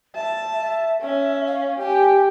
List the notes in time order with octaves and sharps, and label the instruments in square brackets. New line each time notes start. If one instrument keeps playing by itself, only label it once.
[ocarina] E5 [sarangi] A5
[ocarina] E5
[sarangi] C#4 [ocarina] E5
[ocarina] F5
[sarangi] G4 [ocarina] G#5